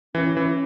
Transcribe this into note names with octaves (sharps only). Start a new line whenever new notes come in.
E3 C#4
E3